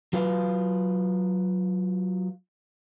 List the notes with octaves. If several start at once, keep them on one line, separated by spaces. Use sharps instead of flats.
F#3 F4 B4 F5